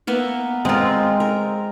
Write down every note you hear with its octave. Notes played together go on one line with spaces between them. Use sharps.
A#3 B3 E5
G#3 C4 F4 A#4
A#4